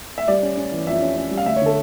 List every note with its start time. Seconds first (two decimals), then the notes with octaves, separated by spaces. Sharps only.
0.18 E5
0.28 G3 D5
0.42 C#4
0.57 C#4
0.72 E3
0.87 F2 E5
1.02 C#4
1.17 C#4
1.31 G3
1.37 F5
1.46 D2 E5
1.56 C#5
1.61 D3 A4